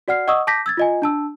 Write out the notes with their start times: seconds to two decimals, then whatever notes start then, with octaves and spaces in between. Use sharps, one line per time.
0.08 F#4 D5 F#5 F6 C7
0.28 D#5 F#5 C#6 D#6 E6
0.47 A5 D6 G6 A#6 B6
0.66 E6 G#6 A6
0.77 F4 D#5 G#5
1.02 D4 A5 E6